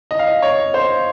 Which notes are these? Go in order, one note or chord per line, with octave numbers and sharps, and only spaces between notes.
D#5
F5
D#5
C#5
C5